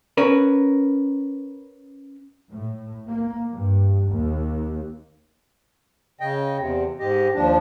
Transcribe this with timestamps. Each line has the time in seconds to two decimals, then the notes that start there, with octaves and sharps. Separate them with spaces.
0.17 C#4 A#4 B4
2.51 A2
3.07 A#3
3.53 G2
4.11 D#2
6.21 C#3 D#5 G5
6.58 E2 C3
6.99 G#2 G4 D#5
7.34 D#2 F3 D4